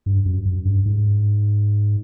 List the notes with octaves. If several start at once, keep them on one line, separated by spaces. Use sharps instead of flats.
G2
F#2
F#2
G2
G#2